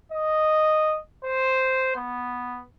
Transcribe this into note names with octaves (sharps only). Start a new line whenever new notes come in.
D#5
C5
B3